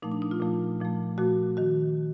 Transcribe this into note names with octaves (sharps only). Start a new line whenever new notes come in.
A#2 F3 A3 D#4
D4
D#4
F4
A#2 F3 A3
A#2 F3 A3
A#2 F3 A3 F#4
D#3 F#4